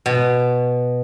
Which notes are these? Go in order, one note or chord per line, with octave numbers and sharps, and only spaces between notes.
B2